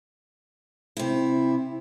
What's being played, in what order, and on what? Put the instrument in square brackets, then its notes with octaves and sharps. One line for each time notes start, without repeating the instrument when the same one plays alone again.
[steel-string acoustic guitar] C3 E4